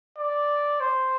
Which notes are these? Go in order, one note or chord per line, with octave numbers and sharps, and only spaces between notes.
D5
C5